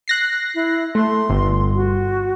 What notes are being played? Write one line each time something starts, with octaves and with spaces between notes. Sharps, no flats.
F#6 A#6 C7
E4
A3 C6
G1
F#4